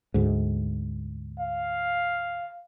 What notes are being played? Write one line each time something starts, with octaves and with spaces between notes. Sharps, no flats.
D2 G#2
F5